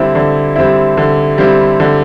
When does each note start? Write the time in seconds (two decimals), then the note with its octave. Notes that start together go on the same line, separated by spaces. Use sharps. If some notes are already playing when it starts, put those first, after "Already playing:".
Already playing: D3 G3 C4 E4
0.15 D3
0.56 G3 C4 E4
0.97 D3
1.38 G3 C4 E4
1.80 D3